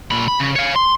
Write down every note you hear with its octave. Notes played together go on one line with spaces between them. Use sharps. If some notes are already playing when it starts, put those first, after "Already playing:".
A#2 B5
B5
C#3
C#5 F5
C6